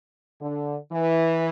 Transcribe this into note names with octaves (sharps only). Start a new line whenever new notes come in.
D3
E3